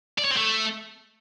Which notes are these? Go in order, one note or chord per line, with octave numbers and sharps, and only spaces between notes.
D5
C#5
C4
A3